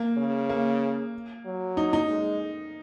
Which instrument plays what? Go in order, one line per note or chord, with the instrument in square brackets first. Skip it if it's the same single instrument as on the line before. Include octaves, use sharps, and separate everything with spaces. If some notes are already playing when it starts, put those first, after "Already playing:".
Already playing: [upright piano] A#3
[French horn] C#3
[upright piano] A#3
[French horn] F#3
[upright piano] D#4
D#4
[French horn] G#3